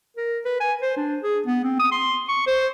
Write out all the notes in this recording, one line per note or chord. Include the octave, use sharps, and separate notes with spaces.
A#4
B4
G#5
C5
D4
G#4
B3
C4
D#6
C6
C#6
C5